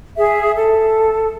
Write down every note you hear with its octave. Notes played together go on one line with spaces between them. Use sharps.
G#4 E5
A4